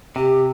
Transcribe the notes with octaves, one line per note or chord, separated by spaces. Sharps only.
C3 G4